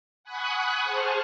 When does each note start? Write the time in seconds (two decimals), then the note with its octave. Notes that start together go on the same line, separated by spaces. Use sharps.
0.24 F#5 G#5 B5 C#6 D#6 F#6
0.84 G#4 C5 A5 C#6 F6